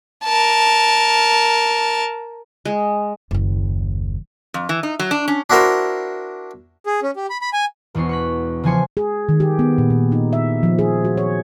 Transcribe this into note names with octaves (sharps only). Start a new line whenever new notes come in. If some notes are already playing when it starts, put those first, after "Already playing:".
A#4 A5
G#3
F#1 D#2
F2
E3
D#4
F#3
D4
C#4
D4 E4 F#4 A#4 C5
G#4
C#4
G4
B5
B5
G#5
E1 E2 B3 C#6 C7
C#6 F#6 B6
C#3 E3 F3 G#5 C6 C#7
G#4
D#3
G4
B3
A#2
A#2
D#4
E5
F3
G#4
F#4
C#5